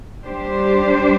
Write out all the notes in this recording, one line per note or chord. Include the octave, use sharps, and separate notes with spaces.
G3 D4 G4 C5